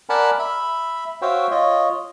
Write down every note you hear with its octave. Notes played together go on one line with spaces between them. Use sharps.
A#4 D5 F#5 G#5 A5 B5
E5 B5
F#4 C5 C#5 E5 F5 G5
F4 C#5 D#5